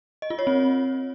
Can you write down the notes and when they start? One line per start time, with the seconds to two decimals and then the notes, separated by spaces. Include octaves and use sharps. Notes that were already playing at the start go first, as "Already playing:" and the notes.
0.22 D#5
0.30 F4
0.39 C#5
0.47 C4